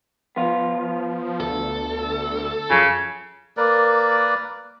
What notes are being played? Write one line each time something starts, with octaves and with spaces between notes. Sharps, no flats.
F3 B3 F4
D2 A4
F#2 C#3 F3
A#3 A#4 B4 D5